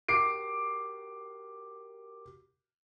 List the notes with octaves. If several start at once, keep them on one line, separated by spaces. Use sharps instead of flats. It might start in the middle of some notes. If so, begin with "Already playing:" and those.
F#4 G4 A#4 D6 C7 D7